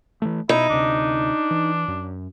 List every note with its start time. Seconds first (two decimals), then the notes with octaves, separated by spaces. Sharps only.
0.22 E3 G3 A3
0.49 B2 D#4 E4
0.69 D2 C3 D4
1.51 E3
1.88 F#2